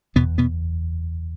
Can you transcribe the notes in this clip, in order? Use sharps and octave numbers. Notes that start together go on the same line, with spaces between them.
F#1 E2 B2 B3
B2 B3